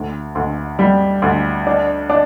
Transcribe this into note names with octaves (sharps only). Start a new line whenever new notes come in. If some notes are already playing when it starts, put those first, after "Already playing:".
Already playing: D2
D2
G3
D2
D4
D4